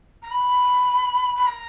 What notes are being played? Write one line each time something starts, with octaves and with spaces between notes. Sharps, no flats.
A#5
B5
B5
A#5